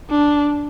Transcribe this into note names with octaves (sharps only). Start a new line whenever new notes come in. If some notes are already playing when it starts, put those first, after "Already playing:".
D4